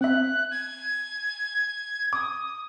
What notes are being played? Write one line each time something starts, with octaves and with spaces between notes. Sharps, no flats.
C4 E5 F#6
G#6
D6 D#6